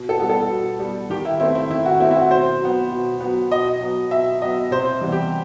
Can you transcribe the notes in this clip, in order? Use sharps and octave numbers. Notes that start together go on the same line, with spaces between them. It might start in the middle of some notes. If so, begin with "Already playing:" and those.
Already playing: B2
A4
G3 B3
A4
B2
G3 B3
D#3 G4
E4
A3 C4 E4
E4
D#3 E4
F#4
A3 C4 E4
E4
F#4
B2 C5
F#3 B3
B2
F#3 B3
B2 D#5
F#3 B3
B2 E5
F#3 B3 D#5
C3 C5
E3 G3 B3
G4